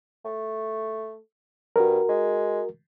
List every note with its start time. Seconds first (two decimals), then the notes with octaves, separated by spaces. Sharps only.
0.25 A3
1.76 G2 F#4 A#4
2.09 G#3